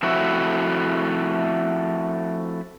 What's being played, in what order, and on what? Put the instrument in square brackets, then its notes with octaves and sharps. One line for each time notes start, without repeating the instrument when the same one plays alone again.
[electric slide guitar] F3 A3 C4 E4 F#4 E5